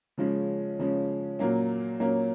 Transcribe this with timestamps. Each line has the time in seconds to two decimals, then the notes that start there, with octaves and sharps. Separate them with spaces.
0.18 C#3 F3 G#3 C#4
0.79 C#3 F3 G#3 C#4
1.39 A#2 F#3 A#3 C#4
1.99 A#2 F#3 A#3 C#4